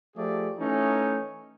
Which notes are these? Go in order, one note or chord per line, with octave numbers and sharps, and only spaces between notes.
F3 A3 G4 G#4 D5
E3 A3 C#4 D#4